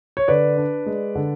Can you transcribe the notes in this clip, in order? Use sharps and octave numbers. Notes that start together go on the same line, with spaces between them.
C#5
D3 B4 D5
D4
G#3
D3